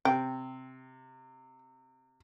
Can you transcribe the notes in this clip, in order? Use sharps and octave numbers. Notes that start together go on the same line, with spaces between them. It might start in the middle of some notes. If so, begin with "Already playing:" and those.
C3 G5